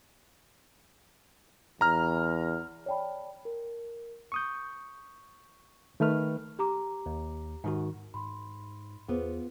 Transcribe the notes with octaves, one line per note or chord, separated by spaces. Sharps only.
E2 A#5 F6
C#5 D5 G5 A5 B5
A#4
C#6 D#6 G6
D#3 A3 B4 F6
G4 A#5 D6
D#2
G#2 D#3 F#4
G#2 B5 C6
E2 B3 F4 G#4 B4 C5